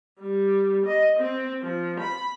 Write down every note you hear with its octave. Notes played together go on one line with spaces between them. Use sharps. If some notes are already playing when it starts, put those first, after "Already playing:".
G3
D#5
C4
F3
B5